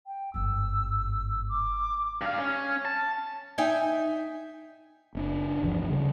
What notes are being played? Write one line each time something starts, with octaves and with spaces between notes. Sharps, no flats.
G5
G1 G#2 E6
D6
G2 F5
C#4
A5
D#4 E5 G5 G#5
F#1 C4 D4
G1 D2 E3 F3
C#3 G3